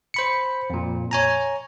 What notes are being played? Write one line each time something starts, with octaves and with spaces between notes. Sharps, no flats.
C5 B5 C#7
F2 A#2
C#5 G#5 A#5